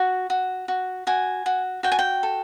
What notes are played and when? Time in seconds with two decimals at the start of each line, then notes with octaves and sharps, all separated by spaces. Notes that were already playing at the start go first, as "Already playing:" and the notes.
Already playing: F#4
0.30 F#4
0.68 F#4
1.07 F#4 G#5
1.46 F#4
1.83 F#4 G5
1.92 G#5
1.99 G5
2.23 A4